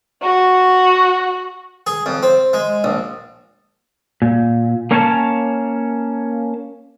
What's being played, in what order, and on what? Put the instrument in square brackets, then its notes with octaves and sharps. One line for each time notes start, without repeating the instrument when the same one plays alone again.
[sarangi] F#4
[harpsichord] G#4
F2
C4
G#3
A#1
[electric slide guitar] A#2
A#3 C#4 C#5 F5 G#5 A5